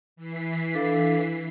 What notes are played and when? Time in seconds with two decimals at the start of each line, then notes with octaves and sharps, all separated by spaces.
0.16 E3 B6 C7
0.74 D4 A4 F5